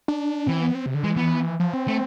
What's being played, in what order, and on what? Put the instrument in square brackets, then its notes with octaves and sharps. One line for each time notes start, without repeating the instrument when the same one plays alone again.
[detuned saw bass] D4
[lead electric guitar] E3 [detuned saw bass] C4
[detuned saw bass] B3
C4
C3
D3
[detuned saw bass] E3 [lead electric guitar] G#3
[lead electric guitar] B3
[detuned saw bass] F3
C4
[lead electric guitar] A3